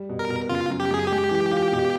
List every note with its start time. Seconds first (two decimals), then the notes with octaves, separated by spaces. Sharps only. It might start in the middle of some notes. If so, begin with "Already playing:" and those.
Already playing: G3
0.09 B2
0.19 A#4
0.29 B2
0.49 C#3 F4
0.70 F#2
0.80 G4
0.90 F#2 G#4
1.07 G#3 G4
1.31 E3
1.52 F4
1.72 B2